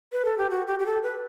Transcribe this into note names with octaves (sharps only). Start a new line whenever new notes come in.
B4
A4
G4
F#4
G4
G4
A4
B4